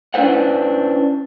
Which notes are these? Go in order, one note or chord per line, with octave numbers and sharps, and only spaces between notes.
C#4 D4 E4 B4 C5 F#5